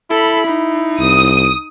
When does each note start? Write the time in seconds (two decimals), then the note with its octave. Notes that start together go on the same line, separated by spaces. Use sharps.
0.10 E4 A4 B5
0.47 D#4
1.00 C2 D#6